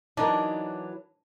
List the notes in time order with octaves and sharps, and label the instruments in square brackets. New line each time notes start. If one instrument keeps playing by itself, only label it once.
[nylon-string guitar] E3 F#3 A#4 [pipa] D4 [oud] D#4